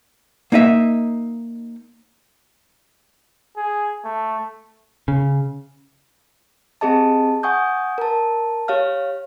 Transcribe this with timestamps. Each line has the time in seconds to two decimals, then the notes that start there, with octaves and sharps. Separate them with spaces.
0.52 A#3 D#4 D#5 E5
3.56 G#4
4.04 A3
5.08 C#3
6.81 C4 G4 G#4 D#5 A5
7.43 F#5 G#5 C#6 D#6 G6
7.98 A#4 A5
8.68 G4 C#5 F5 F6